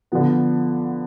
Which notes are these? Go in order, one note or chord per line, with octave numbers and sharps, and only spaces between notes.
D3 F3 B3